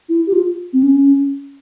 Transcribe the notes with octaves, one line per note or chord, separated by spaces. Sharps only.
E4
G4
F4
C4
C#4